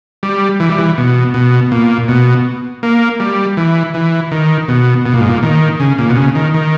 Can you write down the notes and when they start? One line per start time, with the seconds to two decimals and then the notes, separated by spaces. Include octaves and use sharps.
0.23 G3
0.60 E3
0.69 G3
0.78 E3
0.98 B2
1.34 B2
1.72 A#2
2.08 B2
2.83 A#3
3.20 G3
3.57 E3
3.94 E3
4.31 D#3
4.68 B2
5.06 B2
5.14 A#2
5.21 G#2
5.29 A#2
5.43 D#3
5.80 C#3
5.98 A#2
6.10 B2
6.17 C#3
6.35 D#3
6.54 D#3